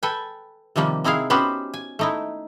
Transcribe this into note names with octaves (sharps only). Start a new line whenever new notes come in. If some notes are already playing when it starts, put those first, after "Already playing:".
A4 B4 G5 G#5
C3 D#3 F3 G3 A#3
C4 D#4 E4 G#4 F5
B3 C#4 F#4 G4 B4 C5
G#5
A3 D#4 E4